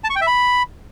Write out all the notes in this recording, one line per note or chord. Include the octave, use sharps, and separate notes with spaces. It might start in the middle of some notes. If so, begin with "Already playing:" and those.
A5
C#6
G5
E5
B5